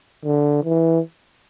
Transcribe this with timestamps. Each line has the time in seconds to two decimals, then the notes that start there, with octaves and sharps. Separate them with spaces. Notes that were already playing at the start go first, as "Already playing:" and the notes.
0.24 D3
0.64 E3